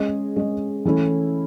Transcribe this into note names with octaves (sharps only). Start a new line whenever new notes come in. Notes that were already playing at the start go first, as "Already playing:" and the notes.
Already playing: G#3 C#4 G#4 D#5
G#3 C#4 G#4 D#5
E3 A3 C#4 E4